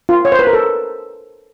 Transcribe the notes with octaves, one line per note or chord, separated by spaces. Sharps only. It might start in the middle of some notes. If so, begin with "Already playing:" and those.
F4
C#5
C5
B4
A#4
A4